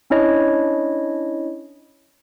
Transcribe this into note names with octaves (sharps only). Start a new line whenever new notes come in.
C#4 D4 E4 C#5 D#5